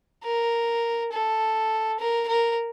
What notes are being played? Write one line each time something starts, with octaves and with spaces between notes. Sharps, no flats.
A#4
A4
A#4
A#4